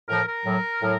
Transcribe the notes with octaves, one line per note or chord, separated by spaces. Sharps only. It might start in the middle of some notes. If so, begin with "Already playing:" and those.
A2 F3 A#4
A#4
A2 F#3
A2 F#3